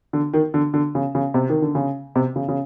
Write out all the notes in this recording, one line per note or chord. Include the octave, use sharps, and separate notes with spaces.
D3
D#3
D3
D3
C#3
C#3
C3
D#3
D3
C#3
C3
C#3
C#3